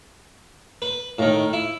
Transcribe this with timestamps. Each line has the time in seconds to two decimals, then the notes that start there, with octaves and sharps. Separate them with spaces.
0.82 B4
1.19 A2 D#3
1.53 E4